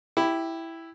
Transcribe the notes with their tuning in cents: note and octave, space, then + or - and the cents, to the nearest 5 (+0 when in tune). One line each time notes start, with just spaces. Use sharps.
E4 +0 G4 +0